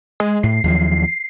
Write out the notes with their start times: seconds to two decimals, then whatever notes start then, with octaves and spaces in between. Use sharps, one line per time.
0.20 G#3
0.43 A2 C7
0.64 D#2 F3 F#3